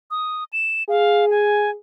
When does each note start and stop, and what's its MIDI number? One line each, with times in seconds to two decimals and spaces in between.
0.11 0.44 87
0.53 0.83 100
0.89 1.76 68
0.89 1.25 77
1.31 1.71 80